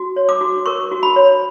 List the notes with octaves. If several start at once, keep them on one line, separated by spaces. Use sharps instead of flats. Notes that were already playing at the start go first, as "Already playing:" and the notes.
Already playing: F#4
C#5
D6
F#4
A#4 C#6
F#4
B5
C#5